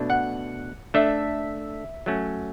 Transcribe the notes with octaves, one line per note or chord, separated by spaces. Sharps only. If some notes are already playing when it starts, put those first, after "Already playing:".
Already playing: B2 A3 D4
F#5
A3 D4 A4 E5
F#3 A3 C#4